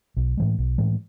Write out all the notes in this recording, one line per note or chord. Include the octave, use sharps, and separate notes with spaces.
B1
A2 E3 G#3
B1
A2 E3 G#3